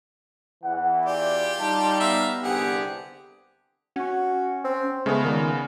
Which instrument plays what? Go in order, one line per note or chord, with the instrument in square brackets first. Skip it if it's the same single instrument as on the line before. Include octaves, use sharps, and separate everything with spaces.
[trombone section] E2 E3 [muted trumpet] F#5
[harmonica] F4 G4 [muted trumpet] D5
[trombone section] G3 D#4 [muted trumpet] A5
[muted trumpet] B3 [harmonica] E5 F5 A#5
[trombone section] C2 D3 G4 [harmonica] G#4 F#5
[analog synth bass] C#4 [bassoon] F#4
[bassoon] C4
[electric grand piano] C#3 B3 [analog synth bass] G#3 [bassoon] A3
[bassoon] A#2 [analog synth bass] D#3